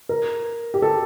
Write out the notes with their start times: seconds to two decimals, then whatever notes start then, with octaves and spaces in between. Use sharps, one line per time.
0.09 A#4
0.74 G4
0.82 A4